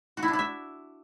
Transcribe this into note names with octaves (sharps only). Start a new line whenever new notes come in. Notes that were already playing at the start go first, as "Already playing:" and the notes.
F#4
E4
D4
E4
E5